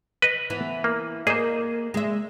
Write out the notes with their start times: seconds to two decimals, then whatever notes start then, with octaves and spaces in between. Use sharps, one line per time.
0.22 B4 D#5
0.50 E3 B3
0.84 A#3
1.27 A#3 G#4 C5 D#5
1.94 G#3 E5